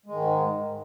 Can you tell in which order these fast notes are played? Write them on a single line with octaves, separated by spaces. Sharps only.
G#3 D#3 G#2